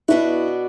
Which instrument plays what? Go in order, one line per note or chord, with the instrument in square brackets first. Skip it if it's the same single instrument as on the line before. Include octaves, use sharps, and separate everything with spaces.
[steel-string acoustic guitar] B2 B3 D4 F#4 [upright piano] E4